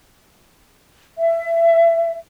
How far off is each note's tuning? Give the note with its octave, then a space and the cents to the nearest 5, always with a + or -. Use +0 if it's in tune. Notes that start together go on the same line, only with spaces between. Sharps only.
E5 +25